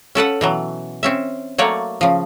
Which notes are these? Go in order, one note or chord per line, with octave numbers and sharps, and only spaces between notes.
C#4 A4 B4 F#5
B2 E3 F#3
C4 C#4 E5
F#3 A3 A#3 C#5 D5
C#3 F3